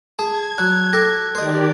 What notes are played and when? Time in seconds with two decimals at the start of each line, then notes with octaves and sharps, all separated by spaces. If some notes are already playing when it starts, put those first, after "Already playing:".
0.19 G#4 A5 G#6
0.58 F#3 F#6
0.93 G4 A4 A#6
1.35 D#3 G4 C5 D5 D#5